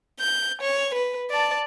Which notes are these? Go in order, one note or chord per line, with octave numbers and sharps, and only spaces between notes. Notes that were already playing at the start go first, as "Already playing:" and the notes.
G6
C#5
B4
D5 A5